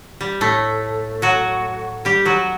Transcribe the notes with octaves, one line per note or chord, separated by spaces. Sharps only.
G3
A2 A3
F#3 F#4
G3 G4
F#3 F#4